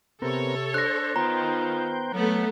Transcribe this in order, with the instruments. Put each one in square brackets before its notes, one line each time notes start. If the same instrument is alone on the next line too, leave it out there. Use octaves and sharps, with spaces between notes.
[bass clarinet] C3 [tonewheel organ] B3 C4 A#4 [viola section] A4 C#5
[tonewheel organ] D4 C5 [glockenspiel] F#6 A#6
[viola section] D#3 [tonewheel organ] B3 C5 G5 [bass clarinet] F4 [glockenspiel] A#5
[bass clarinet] F#3 [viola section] A3 B3